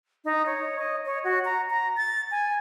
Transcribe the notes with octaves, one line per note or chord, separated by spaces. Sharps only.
D#4
C#5
D#5
C#5
F#4
A#5
A#5
A6
G#5